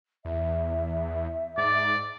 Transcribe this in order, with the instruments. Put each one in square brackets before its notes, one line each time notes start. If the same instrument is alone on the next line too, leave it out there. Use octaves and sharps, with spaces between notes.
[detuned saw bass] E2 [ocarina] E5
[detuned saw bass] G#2 [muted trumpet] D5